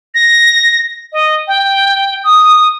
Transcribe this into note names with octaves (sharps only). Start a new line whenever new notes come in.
A#6
D#5
G5
D#6